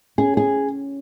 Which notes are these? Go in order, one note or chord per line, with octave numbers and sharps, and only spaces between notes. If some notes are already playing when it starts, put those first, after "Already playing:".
C#4 G#4
G#4